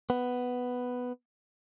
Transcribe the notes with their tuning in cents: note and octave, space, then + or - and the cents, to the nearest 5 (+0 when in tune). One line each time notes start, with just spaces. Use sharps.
B3 +5